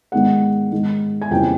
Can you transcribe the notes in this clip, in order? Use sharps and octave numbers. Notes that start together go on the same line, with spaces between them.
G#2 D#3 G#3 B3 F#5
G#2 D#3 G#3
G#5
F2 C#3 E3 G3 A#3 G5